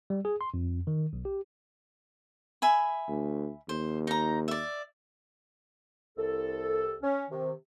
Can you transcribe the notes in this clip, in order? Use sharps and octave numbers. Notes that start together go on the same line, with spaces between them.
G3
G#4
C6
F2
D#3
B1
G4
E5 G#5 B5
D2
D#2 C5
D#4 A#5
D5 E5
C2 A4
C#4
C3 D#3